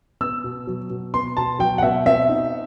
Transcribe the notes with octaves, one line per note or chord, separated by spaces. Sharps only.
B3 E6
B2
F#3
B2
B3 C6
B2 A5
F#3 G5
F#5
B2 E5
C4 E5
D#4